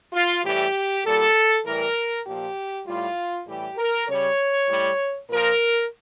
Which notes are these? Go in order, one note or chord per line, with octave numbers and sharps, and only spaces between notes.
F4
A2 E3 G3 G4
A#2 G3 A4
A2 E3 G3 A#4
A#2 F3 G4
A2 G3 F4
A2 E3 G3 G4
A#4
C#3 G3 C#5
A2 G3
A#2 F3 A#4